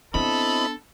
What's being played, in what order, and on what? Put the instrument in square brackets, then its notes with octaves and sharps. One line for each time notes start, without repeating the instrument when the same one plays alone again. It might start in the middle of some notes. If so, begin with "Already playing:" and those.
[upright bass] B3 D4 [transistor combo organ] C4 E4 D#5 [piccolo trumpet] A4 [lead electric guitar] B5